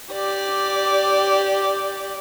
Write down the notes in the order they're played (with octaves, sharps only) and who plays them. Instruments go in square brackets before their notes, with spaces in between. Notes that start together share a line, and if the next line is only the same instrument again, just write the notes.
[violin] G4 D5